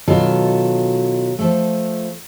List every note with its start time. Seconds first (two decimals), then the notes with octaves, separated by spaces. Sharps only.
0.08 B2 D#3 F#3 F4 A4
1.39 F3 A3